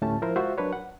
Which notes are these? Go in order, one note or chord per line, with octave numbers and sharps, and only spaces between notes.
D2 A2 A3 C#4 G4 A5
F3 E4 A#4 C5
G#3 F4 F#4 C5 E5
F#3 D4 A#4 B4 C#5
F#5